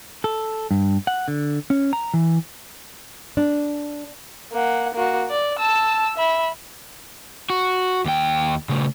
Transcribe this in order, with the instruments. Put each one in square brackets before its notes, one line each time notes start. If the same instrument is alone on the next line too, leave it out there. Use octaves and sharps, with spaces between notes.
[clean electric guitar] A4
G2
F#5
D3
C#4
A#5
E3
[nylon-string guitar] D4
[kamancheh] A#3 F#5
A#3 F#4
D5
A5 E6
E5 B5
[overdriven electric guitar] F#4
D#2 G5
C#3 A3